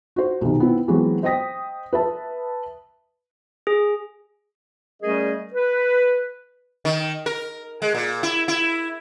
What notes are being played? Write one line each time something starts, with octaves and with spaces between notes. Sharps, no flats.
F#4 C5
B1 C3 D#3
B3 C4 E4
E3 F#3 G#3 B3 C4 F#4
C5 D#5 G5 D#6 A#6 B6
B4 E5 A5
G#4
G3 A3 C#4 G#4 A#4 D#5
B4
D#3
A#4
G#3
A#2
E4
E4